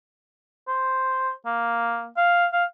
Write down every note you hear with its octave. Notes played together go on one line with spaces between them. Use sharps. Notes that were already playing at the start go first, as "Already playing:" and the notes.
C5
A#3
F5
F5